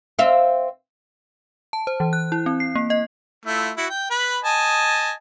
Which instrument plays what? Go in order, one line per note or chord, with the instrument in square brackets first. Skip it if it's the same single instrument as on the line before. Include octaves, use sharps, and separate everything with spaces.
[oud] C4 E5 F5
[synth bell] A5
C5
E3
F#6
E4
C4
C7
A#3
D#5
[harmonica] A3 E4 F4
E4 F#4
G5
B4 B5
D#5 G#5 A5